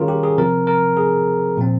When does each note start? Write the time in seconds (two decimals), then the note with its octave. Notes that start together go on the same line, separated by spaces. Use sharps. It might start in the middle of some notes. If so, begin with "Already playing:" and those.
Already playing: D#3 G3 C#4 F4 G#4 A#4 C#5
0.08 G4
0.23 G#4
0.37 C3 F3 C4 A#4
0.67 A#4
0.97 G#4
1.57 A#2 F3 C4